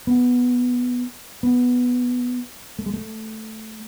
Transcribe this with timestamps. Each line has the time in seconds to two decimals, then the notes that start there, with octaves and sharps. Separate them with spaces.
0.07 B3
1.43 B3
2.79 A3
2.86 G#3
2.94 A3